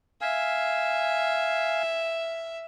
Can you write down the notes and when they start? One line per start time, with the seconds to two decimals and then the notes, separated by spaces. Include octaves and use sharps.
0.21 E5 F5 G#5